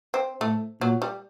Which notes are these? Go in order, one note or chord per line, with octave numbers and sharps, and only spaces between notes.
C4
A2 A3
A#2 F#3
G3